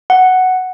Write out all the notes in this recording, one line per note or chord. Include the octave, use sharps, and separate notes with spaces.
F#5